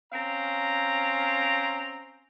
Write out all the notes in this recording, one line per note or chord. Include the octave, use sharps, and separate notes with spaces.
C4 C#4 F5 A#5